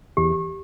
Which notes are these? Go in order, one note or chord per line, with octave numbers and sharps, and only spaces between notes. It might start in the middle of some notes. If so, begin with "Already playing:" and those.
E2 G4